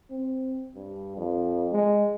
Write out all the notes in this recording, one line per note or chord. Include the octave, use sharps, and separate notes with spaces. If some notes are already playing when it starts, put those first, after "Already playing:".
C4
G2
F2
G#3